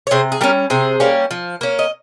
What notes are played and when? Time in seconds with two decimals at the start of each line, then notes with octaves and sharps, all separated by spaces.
0.07 C#5
0.11 C3 G#4 C5
0.32 G#4
0.41 G3 C#4 G4 A#4
0.70 C3 G#4 C5
1.00 G3 A#3 C#4
1.31 F3
1.61 A#3 C#4
1.79 D#5